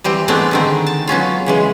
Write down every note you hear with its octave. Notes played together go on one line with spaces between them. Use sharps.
E3 G3 C4
E3 G#3 A3 B3 C4 D4
D3 D#3 C4
A5
F#3 B3 C#4 F4
C#3 E3 G#3